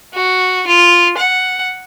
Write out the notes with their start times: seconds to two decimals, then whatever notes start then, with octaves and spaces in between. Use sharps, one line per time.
0.14 F#4
0.67 F4
1.18 F#5